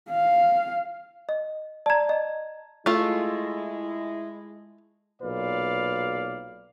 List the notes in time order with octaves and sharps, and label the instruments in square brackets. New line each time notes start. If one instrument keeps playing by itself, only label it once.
[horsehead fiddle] F5
[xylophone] D#5
[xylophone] D5 A#5 [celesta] A5 G#6
[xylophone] D#5
[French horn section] G#3 E4 [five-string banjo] A3 F4
[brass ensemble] B1 A#2 B4 D5 F5